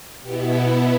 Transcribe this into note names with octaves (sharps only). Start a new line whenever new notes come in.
B2 B3 E4 G4